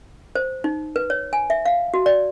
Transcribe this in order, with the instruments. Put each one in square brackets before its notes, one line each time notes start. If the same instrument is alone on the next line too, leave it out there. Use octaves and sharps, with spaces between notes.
[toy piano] C5
D#4
B4
C#5
G#5
E5
F5
F#4
D5